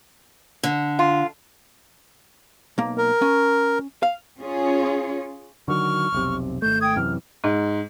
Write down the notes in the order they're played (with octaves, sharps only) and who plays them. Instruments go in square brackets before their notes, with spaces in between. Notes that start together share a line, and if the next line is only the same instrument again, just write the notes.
[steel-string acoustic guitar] D3
[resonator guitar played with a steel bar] F4
[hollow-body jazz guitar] B1 A#3
[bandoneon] A#4
[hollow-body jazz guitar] C#4
F5
[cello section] C#4 F4 G#4 C#5
[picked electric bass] D3 D#3 F#3 [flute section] C#6 F6
[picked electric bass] F1 B1 C3
[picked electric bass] G#1 A3 [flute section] G6
[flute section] G5 D#6 G#6
[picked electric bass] F#2 C3 E3 [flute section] F6
[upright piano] G#2